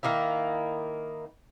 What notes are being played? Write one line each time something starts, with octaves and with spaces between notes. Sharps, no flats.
D#3 A#3 D#4 E4